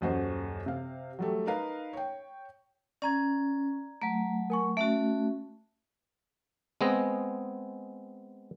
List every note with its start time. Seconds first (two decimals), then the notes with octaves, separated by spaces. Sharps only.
0.01 D#1 F#2 F#4 C5 D#5
0.66 C3 F5
1.19 F#3 G3 A3
1.47 D#4 A#4 B4 F5
1.93 C#5 G5
3.02 C#4 D5 A#5 G#6
4.02 F#3 A3 A#5
4.50 A#4 G#5 C#6
4.77 A3 C#4 F#4 E5
6.81 G#3 B3 C4 G#4 D#5